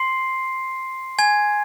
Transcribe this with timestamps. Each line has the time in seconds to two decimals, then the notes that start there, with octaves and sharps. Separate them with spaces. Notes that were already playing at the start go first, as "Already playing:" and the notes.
Already playing: C6 C7
1.19 G#5 G#6